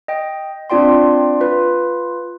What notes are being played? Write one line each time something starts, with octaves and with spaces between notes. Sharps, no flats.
D#5 G5
C4 D4 F4 D5 G5 C6
F4 B4